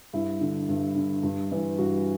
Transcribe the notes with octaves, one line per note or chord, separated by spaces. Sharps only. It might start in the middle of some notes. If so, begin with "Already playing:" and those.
G2 E4
D3
G2
D3
G2
E3
G2 F#4